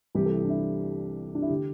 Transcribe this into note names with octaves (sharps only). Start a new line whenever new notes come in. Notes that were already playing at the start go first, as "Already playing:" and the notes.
C2 C3 E3 G4
A4
G4
D4
E4
D4
E4
D3 G4